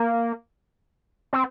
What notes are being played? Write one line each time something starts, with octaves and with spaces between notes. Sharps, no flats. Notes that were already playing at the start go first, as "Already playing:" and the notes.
Already playing: A#3
C4